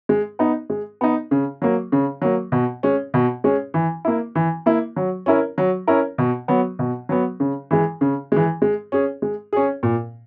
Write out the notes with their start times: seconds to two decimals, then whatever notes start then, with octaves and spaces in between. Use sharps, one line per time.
0.09 G#3
0.39 B3 D#4
0.70 G#3
1.01 B3 D#4
1.31 C#3
1.62 F#3 A#3
1.92 C#3
2.22 F#3 A#3
2.52 B2
2.83 G#3 C#4
3.14 B2
3.44 G#3 C#4
3.74 E3
4.05 A#3 E4
4.35 E3
4.66 A#3 E4
4.96 F#3
5.26 C#4 E4 A#4
5.58 F#3
5.87 C#4 E4 A#4
6.18 B2
6.48 F#3 B3
6.79 B2
7.09 F#3 B3
7.40 C#3
7.71 E3 G#3
8.01 C#3
8.32 E3 G#3
8.62 G#3
8.92 C#4 G#4
9.22 G#3
9.53 C#4 G#4
9.83 A#2